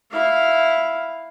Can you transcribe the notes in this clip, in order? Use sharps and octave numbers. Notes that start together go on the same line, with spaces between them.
E4 F5